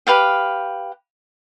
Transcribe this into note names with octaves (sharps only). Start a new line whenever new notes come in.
G4 B4 F5 G5